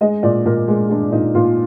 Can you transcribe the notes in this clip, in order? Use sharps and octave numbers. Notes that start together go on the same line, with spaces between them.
G#3 D#5
A#2 D5
A#2 A#4
G#3
G#3 D4
A#2 D#4
A#2 F4